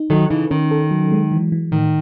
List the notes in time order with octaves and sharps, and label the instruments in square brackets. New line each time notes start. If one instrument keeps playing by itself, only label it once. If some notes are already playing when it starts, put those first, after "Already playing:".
Already playing: [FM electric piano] D#4
[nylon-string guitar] D#3 F#3 [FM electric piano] A4
[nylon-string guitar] C#3 E3 [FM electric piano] D#4
[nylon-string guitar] D#3 [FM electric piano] C#4
[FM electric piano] A4
F#3
G#3
E3
E3
[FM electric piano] A2 [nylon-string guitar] D#3